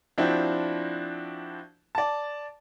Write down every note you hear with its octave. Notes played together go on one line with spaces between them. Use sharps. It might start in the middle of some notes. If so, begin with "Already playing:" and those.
F3 C4 D4 E4 F#4
D5 A5